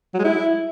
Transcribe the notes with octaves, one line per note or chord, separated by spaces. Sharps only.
F#3
G#3
E4